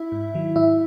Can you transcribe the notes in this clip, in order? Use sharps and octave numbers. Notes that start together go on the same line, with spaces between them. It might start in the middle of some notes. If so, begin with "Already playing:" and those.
Already playing: E4 E5
G#2
D#3 F#3
G#2 E4 E5